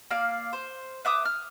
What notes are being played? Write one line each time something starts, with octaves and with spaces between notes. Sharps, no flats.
A#3 D5 F5
C5
B4 E5 D6 D#6
F6